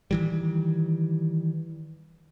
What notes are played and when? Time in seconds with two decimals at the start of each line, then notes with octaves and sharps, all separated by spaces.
0.11 D#3 E3 G3